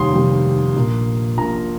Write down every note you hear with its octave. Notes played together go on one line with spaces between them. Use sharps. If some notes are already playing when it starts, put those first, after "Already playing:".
Already playing: F1 D#2 D#3 G3 C6 D#6
F1 D#2 D#3 G3
A#1 A#2 A#3
A#1 A#2 A#3 A#5